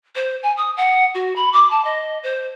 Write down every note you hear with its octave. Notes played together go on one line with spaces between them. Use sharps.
C5
G#5
D#6
F#5
F#4
B5
D6
A5
D#5
C5